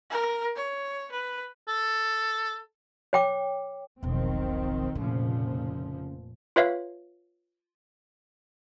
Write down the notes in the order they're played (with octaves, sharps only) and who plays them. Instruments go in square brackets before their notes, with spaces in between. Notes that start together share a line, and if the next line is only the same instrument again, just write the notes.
[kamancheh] A#4
C#5
B4
[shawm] A4
[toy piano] C#5 G5 D6
[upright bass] E1 B1 [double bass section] D#3 F3 C4
[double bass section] F1 A#2 F3 [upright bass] C#3
[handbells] F4 B4 C#5 E5 F5